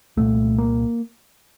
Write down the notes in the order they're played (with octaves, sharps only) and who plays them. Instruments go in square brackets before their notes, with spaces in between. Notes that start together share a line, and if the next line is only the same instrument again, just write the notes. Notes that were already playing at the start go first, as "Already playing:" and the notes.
[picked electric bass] C2 A#2 A3
A#3